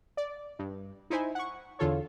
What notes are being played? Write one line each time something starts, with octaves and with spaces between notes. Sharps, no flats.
D5
G2
D#4 E4 C5 G#5
F#5 C#6
E2 D3 F4 A4 C#5